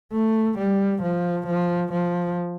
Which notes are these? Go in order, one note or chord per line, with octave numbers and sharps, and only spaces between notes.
A3
G3
F3
F3
F3